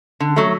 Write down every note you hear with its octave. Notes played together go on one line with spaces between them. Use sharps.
D3
F#3 A3